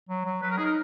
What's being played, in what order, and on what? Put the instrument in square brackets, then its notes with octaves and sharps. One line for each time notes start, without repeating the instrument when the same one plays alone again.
[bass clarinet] F#3
F#3
[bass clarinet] F#3 [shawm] B4
[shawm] A#4
[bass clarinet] D#4 [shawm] G#4
[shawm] A#4